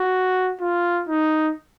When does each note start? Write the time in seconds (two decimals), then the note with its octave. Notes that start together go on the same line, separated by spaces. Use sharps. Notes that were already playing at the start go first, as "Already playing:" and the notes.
Already playing: F#4
0.61 F4
1.08 D#4